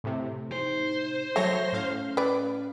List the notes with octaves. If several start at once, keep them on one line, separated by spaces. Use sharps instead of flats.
A2 C3
D#4 C5
F#3 A3 C#5 E5 A#6
A2 C#4 F5
B4 D5